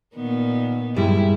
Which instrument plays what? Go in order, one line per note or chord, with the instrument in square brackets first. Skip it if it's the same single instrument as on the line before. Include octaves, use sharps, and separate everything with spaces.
[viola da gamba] A#2 D#3 B3
[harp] G2 G3 G#3 [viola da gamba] E4